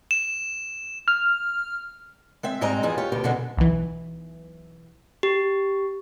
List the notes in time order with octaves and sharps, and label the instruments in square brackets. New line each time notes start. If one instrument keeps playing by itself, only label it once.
[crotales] E7
[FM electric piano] F6
[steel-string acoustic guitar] G#3 C4 E5
G#2 G3 G#3 C4 D#5 A#5
F2 E3 F3 G#4
F4 G4 C#5
D2 B2 G4
F2 B2 D3 E3 G#3 B3
[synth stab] B1 E3
[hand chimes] G4